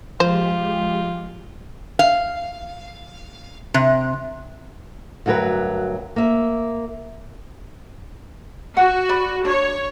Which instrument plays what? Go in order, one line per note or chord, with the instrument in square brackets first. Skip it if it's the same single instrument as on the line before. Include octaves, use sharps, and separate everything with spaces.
[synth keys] F3 [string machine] G#3 G4 [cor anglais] F4 [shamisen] C5
[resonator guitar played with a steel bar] F5
C3
[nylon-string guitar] D2 G2 F#3 A#4 B4
A#3 E5
[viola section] F#4 [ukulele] F#5
[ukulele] D5 B5
[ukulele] D4 [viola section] C#5